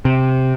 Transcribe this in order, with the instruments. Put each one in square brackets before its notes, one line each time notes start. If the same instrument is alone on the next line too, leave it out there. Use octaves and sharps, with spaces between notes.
[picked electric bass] C3